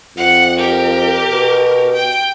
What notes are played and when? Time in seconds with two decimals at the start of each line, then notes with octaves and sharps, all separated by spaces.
0.17 F2 F#5
0.58 G4 A#4
1.31 B2
1.93 G5